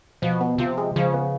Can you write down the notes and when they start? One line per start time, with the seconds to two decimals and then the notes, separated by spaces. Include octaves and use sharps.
0.22 B2 F3
0.41 B3
0.58 C3 F3
0.77 G#3
0.96 C#3 F3
1.14 B3